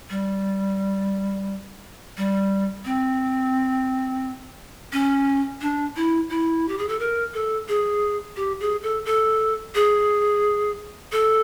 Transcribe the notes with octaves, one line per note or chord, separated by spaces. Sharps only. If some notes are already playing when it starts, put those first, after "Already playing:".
G3
G3
C4
C#4
D4
E4
E4
G4
G#4
A4
A#4
A4
G#4
G4
G#4
A4
A4
G#4
A4